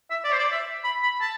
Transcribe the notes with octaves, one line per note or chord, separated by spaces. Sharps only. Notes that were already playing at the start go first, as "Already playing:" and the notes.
E5
D5
C5
D5
E5
B5
B5
A5